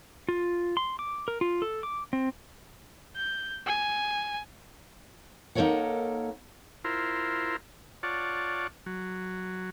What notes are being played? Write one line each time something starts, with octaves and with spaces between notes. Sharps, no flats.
F4
C6
D6
A#4
F4
A4
D6
C4
G6
G#5
A#3 D#4 A4 A#4 C#5 F#5
E4 F4 A#4 C5
F4 C#5 D5 F#5 A5
F#3